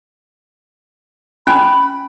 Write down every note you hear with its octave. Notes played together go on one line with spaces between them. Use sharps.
C#4 G#5 B5